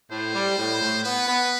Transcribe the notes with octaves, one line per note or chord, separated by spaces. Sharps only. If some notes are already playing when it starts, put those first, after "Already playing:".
A2 C5
G3
A2
A2
B3 B4
B3